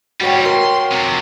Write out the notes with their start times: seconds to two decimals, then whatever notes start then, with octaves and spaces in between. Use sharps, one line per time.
0.21 G#2 G3 F#4 C#5 G5
0.45 A#4 C6
0.92 F2 C3